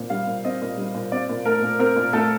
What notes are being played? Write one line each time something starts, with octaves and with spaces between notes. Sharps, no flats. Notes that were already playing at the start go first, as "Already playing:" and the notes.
Already playing: A#2 C4
G3 F5
A#2
C4 D#5
A#2
G3
A#2
C4 D5
A#2
A3 A#4
A#2
C4 A#4
A#2
A3 A4